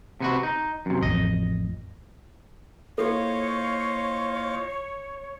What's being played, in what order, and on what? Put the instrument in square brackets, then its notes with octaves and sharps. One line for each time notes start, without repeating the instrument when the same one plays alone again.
[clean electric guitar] C3 B3 F#4
D#4
F#2 C3
[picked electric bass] A1 F2 [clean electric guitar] D#5
[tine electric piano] A#3 E4 F4 [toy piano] A4 [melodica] C5 D#5 F5 [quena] C#5